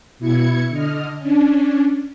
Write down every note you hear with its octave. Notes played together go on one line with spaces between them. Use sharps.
B2 E4 G#6 C#7
D3 D#5 F6
C#4 D4